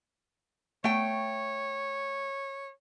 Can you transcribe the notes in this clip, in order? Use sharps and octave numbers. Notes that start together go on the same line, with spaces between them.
A3 C#5 G5